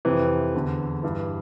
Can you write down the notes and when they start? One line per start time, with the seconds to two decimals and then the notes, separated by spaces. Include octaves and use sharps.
0.05 F2 C3 E3
0.54 E2 D3
1.03 G2 E3